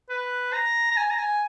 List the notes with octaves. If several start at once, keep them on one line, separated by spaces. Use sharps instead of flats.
B4
A#5
A#5
G#5
A#5
G#5